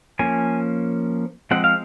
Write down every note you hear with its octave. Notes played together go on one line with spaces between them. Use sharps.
F3 A#3 C#4 G#5
F3 G#3 C4 F#5
F5